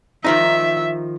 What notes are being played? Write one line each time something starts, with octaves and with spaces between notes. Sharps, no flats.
D#3 F3 D#4 E5